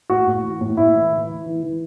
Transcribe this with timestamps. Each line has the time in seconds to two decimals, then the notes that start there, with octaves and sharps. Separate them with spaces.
0.10 A2 F#4
0.27 A2
0.43 E3
0.61 A2
0.77 A2 E4
0.95 E3
1.12 E3
1.29 E3
1.46 E3
1.63 E3